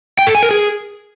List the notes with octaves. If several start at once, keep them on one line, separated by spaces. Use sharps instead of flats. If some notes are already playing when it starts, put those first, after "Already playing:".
G5
A4
G#5
A#4
G#4